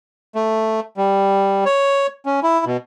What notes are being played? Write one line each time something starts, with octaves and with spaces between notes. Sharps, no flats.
A3
G3
C#5
C#4
E4
B2